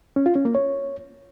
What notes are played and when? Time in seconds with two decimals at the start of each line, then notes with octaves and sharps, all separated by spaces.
0.16 C#4
0.26 F4
0.35 C#4
0.45 A#3
0.55 C#5